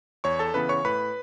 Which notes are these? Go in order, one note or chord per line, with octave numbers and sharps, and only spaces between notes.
E2 C#5 C#6
A4 A5
C#3 E3 B3 B4 B5
C#5 C#6
A2 B4 B5